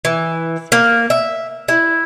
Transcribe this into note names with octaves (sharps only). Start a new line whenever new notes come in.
E3
A#3
E5
E4